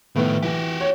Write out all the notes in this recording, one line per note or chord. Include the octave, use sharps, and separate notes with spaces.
A2 D#3 F3 B3
E3 F#4 G4
C#5